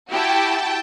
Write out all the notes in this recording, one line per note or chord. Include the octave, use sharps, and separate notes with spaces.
E4 F#4 G4 G5 A5